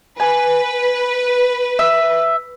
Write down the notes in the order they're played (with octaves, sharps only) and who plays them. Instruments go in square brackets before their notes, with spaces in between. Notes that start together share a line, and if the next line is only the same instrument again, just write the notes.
[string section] B4 [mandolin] G#5
[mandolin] E5